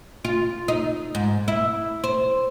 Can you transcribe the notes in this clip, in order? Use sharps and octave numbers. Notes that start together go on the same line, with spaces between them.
F4
D#4
G#2
E4
C5